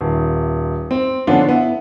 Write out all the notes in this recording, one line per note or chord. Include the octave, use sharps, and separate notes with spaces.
D#1
C4
D3 F3 B3 C#4 D4 F4
B3 E4